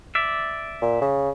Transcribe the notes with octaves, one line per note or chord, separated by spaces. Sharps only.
D5 E5
A#2
C#3